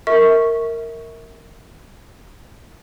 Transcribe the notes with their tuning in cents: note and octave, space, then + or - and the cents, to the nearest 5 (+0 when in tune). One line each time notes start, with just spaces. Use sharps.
A#4 -15 E5 -30 C#6 +0